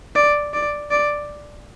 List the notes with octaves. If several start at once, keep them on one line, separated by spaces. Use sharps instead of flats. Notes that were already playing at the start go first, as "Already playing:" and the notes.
D5
D5
D5